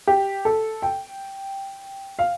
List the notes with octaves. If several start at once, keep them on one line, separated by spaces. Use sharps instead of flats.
G4
A4
G5
F5